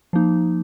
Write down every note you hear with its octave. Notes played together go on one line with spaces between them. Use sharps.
F3 A#3 D#4